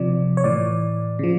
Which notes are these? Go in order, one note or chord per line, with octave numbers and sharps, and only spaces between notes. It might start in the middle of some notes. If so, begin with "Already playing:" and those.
Already playing: C3 F3 D5
C#5
A2 E3 D5
C#3 F3